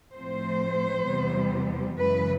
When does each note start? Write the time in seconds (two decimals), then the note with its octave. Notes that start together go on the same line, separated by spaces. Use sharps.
0.15 A2 F3 A3 C4 C5
1.07 E2 C3 E3 G3 B3
1.98 F#2 C#3 E3 G#3 B4